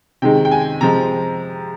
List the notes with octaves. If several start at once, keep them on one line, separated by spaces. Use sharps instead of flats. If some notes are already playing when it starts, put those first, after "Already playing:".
C3 D#3 G#3 G5
G5
G#5
C3 F3 G#3 A#5